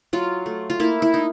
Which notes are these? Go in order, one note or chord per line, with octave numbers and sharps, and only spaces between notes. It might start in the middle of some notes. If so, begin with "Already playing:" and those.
F#3 F4
A3
F4
A#3 E4
E4
D#4